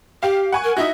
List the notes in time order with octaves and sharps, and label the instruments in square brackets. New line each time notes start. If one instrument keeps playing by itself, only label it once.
[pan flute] G4 [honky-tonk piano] F5 G5
[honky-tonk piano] F#5 G#5 C#6
[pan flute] A#4
[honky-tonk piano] D#4 E4 F#4 [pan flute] E5